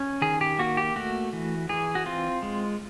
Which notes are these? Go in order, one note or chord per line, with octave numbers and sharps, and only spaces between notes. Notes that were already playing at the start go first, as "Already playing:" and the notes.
Already playing: C#4
D#3 G#4
G4
A#3 F#4
G4
A3 F#4
E3
E3 G#4
F#4
C4 F4
G#3